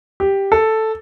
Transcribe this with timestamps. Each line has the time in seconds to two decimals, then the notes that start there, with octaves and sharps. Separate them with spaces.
0.20 G4
0.52 A4